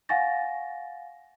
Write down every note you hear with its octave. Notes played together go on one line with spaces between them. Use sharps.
F5 F#5 G#5 C#6 A6 A#6